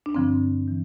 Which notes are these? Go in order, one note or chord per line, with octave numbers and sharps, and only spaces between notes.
D4
G2 D3 F3 C4
E3